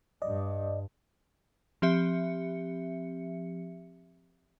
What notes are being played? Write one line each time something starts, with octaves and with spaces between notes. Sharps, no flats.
G2 D5 D#5
F3 C4 G4 E5 C#7